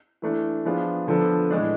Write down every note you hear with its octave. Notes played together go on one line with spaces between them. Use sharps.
E3 A3 D4
F3 B3 D4 F4 G#4
D3 F3 B3 D4 A4
A2 E3 G#3 D4